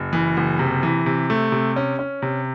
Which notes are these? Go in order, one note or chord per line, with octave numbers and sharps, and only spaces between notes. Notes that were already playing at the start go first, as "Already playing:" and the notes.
Already playing: F#1
E3
F#1
C3
E3
C3
A3
C3
C#4
C#4
C3